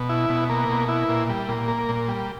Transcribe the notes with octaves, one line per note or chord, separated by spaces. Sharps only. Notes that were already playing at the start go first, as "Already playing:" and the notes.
Already playing: B2
E4
B2
A#3
B2
E4
A#2
G3
A#2
A#3
A#2
G3